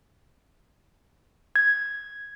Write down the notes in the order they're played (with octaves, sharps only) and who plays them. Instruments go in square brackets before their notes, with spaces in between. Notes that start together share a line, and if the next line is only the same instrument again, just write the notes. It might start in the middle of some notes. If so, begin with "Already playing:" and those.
[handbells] G#6